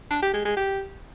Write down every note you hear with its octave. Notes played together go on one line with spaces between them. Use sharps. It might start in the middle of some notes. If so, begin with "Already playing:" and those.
D4
G4
G#3
G#3
G4